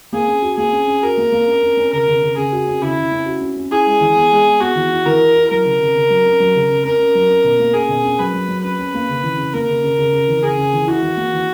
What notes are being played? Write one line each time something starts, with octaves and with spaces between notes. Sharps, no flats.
A#3 G#4
C#4
F#4
A#3 G#4
C#4
C#4
F#4 A#4
A#3
A#3
C#4
C#4
C#4
C#3 A#4
C#3
C#3
C#3 G#4
F#4
C#4
C#3 E4
C#3
C#4
F#4
C#4
C#4
E4 G#4
G#3
E3
B3
G#3
B3
B3 F#4
E3
E4
E3 A#4
E4
E4
F#3 A#4
C#3
C#3
C#3
F#3
C#4
F#3
C#3
C#3
C#4 A#4
C#4
F#3
C#4
B2
A#3
C#4 G#4
B2
C#4
F#3 B4
F#3
F#3
C#4 B4
C#4
A#3
C#3
E3
C#3
A#3 A#4
C#3
C#3
C#3
C#3
E3
C#3 G#4
C#3
E3
E4 F#4
E3
A#3
E3